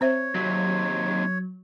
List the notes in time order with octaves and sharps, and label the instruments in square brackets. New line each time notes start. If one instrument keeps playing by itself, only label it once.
[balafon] C4 C5 E5 [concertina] C#5
[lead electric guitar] D#2 C3 [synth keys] F#3